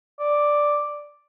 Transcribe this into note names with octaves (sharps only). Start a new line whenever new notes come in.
D5